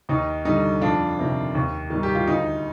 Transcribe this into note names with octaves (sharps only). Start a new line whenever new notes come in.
D#2 D#4
D3 G3 D#4
F2 D4 F4
C3 D#3
D#2
D#3 G3
G4
F4
D2 D#4